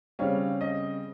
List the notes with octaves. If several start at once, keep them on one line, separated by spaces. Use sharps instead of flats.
C#3 G3 C4 C#5 F5
D#5